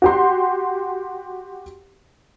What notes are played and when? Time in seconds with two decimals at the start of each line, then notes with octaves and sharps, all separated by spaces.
0.02 F#4 G4 C6